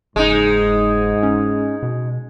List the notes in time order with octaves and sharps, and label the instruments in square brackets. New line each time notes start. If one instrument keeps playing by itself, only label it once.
[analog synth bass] F#1 [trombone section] G#2 [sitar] G#3 D#4
[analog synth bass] C#4
B2